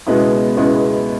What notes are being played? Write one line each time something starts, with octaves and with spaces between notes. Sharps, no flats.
C#2 B2 G#3 B3 E4
C#2 B2 G#3 B3 E4